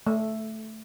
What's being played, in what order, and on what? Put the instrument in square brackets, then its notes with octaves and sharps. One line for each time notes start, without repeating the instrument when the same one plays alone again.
[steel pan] A3